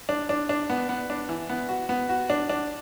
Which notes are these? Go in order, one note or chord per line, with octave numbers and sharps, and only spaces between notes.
D4
D4
D4
B3
B3
D4
E3
B3
F#4
B3
F#4
D4
D4